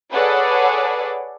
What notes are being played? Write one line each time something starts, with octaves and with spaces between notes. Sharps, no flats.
G#4 A4 B4 C#5 D5 F#5